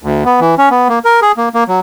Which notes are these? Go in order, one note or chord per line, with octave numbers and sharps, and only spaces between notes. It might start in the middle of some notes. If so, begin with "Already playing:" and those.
D2
B3
E3
C#4
B3
A#3
A#4
G#4
A#3
A#3
F#3